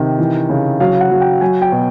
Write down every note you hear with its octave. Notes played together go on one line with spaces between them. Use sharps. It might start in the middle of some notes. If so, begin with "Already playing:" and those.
Already playing: C3 D#3
E3
C#3
F#3 F5
F#5
F#3
G5
F#3 G#5
G5
B2